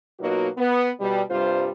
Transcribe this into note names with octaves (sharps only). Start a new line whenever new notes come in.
B2 F#3 A#3 D#4 F4 F#4
B3
B2 G3
G2 C3 G3 F4 C5